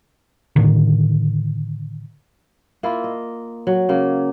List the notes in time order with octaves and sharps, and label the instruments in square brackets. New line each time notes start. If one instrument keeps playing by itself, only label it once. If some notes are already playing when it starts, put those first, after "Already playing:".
[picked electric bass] A2 D3 D#3
[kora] A#3 E4 F4
D#5
F#3
C#3 A#3